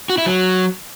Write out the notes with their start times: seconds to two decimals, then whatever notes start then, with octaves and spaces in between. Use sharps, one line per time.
0.10 F#4
0.18 E4
0.26 F#3